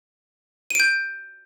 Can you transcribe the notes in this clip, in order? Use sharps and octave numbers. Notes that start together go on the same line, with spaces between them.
G6 D7 D#7